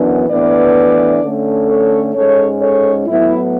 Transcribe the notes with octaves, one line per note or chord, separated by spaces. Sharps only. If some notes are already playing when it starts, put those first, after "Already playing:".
Already playing: F#2 E3 B3 D4
A2 E3 B3 D4 B4 D5
D3 A3 C#4
A4 C#5
G#2 G#3 C#4 A4 C#5
A4 C#5
A2 F#3 B3 E4